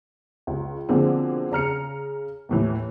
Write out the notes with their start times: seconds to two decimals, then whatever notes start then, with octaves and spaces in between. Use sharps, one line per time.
0.47 C#2
0.89 B2 D3 F3 A#3 C4 G#4
1.52 C#3 A#5 F6 C#7
2.49 D#2 A2 E3